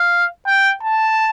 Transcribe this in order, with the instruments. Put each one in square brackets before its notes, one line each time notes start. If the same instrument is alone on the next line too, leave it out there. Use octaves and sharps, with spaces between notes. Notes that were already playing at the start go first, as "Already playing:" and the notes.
Already playing: [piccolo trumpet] F5
G5
A5